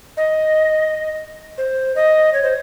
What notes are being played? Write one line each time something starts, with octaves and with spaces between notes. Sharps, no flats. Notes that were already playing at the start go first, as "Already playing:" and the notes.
D#5
C5
D#5
C#5
C5